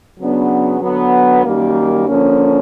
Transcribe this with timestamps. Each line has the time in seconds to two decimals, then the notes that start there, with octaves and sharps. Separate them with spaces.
0.18 C#3 F#3 B3 D4
0.82 D3 F#3 B3
1.44 F#2 D#3 G3 A#3
2.07 D3 F3 A#3 C#4